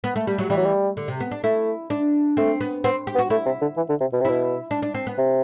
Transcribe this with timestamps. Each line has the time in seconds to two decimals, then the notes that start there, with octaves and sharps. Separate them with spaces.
0.04 B3
0.16 A3
0.27 G3
0.38 F#3
0.50 E3 G3
0.57 F#3
0.66 G3
0.97 D3
1.08 C3
1.20 B3
1.31 D4
1.43 A3 E4
1.90 D4
2.37 A3 C4
2.61 B3
2.84 B3 C4
3.07 G4
3.15 B3
3.18 F#4
3.30 A3 E4
3.46 C3
3.62 D3
3.77 E3
3.89 D3
4.00 C3
4.13 B2
4.21 C3
4.25 B2 E4
4.71 D4
4.82 D4
4.94 C4
5.07 B3
5.18 C3